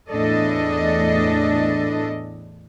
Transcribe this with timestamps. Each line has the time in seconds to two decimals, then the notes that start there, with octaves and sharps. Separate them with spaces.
0.11 E2 A2 D4 A4 D#5